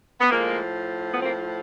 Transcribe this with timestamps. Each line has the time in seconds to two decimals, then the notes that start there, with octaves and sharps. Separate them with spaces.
0.21 B3
0.31 A2 F3 G#3 A#3
1.12 B3
1.22 A#3 C4